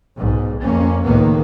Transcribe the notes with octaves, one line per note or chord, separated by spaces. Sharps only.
B1 G#2
F2 A#3 C#4
C#2 A2 D#3 A#3 B3